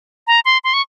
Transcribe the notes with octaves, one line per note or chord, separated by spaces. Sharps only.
A#5
C6
C6
C#6